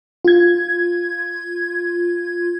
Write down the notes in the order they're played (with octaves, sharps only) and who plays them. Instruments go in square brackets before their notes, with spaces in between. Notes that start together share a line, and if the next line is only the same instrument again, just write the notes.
[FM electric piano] F4 G#6